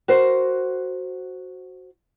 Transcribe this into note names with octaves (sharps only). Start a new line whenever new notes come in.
F#4 A#4 C5